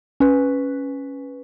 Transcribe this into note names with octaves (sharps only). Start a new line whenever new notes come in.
C#4 B4